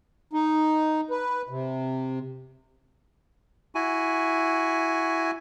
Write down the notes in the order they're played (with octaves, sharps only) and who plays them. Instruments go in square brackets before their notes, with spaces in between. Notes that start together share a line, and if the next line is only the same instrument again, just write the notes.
[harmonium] D#4
B4
C3
[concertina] E4 F#4 G#5